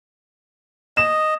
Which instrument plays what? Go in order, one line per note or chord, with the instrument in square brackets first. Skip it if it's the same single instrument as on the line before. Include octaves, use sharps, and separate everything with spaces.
[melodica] D#5 [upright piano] E7